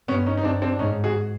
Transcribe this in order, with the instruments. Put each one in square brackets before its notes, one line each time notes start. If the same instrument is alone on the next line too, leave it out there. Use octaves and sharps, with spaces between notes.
[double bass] G2 [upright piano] B3 C#4
[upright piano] C#4 D#4
D#4
[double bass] G2 [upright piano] C4 D4
[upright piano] C4 D4
D4
[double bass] G#2 [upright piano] C#4 D#4
[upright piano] F#4 G#4